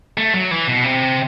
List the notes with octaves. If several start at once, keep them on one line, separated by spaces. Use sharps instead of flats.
A3
F#3
E3
B2
C3